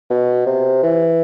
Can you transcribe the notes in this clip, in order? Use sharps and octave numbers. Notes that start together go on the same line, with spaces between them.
B2
C3
E3